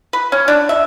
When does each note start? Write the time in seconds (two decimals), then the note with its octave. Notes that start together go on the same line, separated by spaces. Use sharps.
0.13 B4
0.32 C#4
0.48 D4
0.69 E5